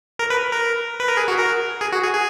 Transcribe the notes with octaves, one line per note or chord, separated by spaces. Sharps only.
A#4
B4
A#4
B4
A#4
G#4
F#4
A#4
G#4
F#4
G#4
G#4